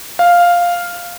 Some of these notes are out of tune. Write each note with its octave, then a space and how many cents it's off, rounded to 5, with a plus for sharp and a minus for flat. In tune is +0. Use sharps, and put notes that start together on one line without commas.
F5 +0